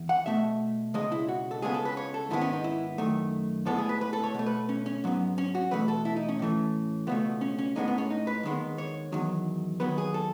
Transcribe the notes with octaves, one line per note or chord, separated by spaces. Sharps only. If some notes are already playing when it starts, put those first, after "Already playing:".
Already playing: E2
F#5
B2 A3 E5
C#2 B2 G#3 D#5
E4
F#4
A4
C#2 C#3 G#3 B3 G#4
A4
B4
C#5
A4
G#2 D#3 G#3 B3 E4
C#4
D#4
E4
F#2 D#3 A3
A2 G#3 B3 A4
G#4
B4
B4
A4
C#5
B2 A3
B4
C#4
C#4
G#2 F#3 B3
C#4
F#4
E2 B2 A3 B4
A4
E4
D#4
C#4
A2 E3 A3
C#2 B2 A3 B3
C#4
C#4
A2 G#3 B3 D#4
B3
C#4
D#4
B4
D#2 D#3 G#3 B3
C#5
E2 D#3 F#3
D#2 D#3 F#3 B3 B4
G#4
A4